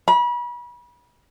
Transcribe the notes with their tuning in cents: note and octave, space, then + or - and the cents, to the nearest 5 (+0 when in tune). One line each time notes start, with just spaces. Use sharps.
B5 -35